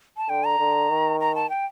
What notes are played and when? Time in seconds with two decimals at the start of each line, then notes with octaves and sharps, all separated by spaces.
0.17 A5
0.28 D3 G5
0.44 A#5
0.59 D3
0.90 D#3
1.20 A#5
1.35 A5
1.50 G5